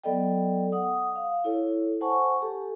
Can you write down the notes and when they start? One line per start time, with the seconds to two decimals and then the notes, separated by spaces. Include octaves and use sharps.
0.04 F#3 B3 A4 D5 D#5 G5
0.72 F#5 D#6
1.16 F5
1.44 E4 A4 C#5
2.01 C5 F#5 G#5 A5 C#6
2.42 G4 A4